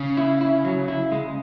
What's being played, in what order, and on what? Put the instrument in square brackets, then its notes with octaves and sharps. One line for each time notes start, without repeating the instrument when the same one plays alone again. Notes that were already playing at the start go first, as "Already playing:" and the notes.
Already playing: [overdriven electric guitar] C#3
[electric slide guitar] E4
E4
F#3
E4
G#3